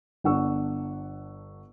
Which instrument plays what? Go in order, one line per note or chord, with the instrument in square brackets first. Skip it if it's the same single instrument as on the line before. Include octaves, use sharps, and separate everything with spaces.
[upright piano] G1 D4 F#5 C#6 E6